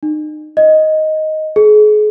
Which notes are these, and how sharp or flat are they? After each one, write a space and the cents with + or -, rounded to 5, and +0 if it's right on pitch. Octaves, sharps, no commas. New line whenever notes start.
D#4 -35
D#5 +5
G#4 +35